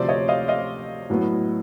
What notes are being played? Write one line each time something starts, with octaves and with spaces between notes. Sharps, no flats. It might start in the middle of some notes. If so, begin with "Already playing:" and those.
Already playing: D2 C3 F3 C5 D5
C#5 D#5
D#5 F5
D#5 F5
A2 F#3 B3